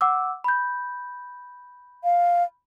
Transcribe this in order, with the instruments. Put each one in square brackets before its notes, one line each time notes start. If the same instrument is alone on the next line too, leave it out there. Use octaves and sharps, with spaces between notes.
[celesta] F#5 D6 E6
B5 G6
[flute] F5